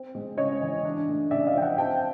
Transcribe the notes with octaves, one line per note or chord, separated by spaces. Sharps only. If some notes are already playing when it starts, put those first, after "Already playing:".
Already playing: C4
G#3
C#3 C#5 D#5
E3
D4
A3
C#3 D5 E5
D#5 F5
F3 G5
E5 F#5
C4 G5 A5